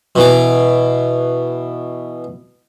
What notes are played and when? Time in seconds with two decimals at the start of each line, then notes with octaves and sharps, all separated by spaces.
0.15 B2 E3 D6